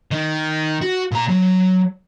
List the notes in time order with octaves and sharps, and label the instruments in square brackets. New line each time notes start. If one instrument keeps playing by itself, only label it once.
[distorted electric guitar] D#3
F#4
A#2 A#5
F#3